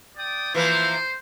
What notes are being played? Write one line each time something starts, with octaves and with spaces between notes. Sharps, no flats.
D5 G5 D#6
E3 F3 A#3 C5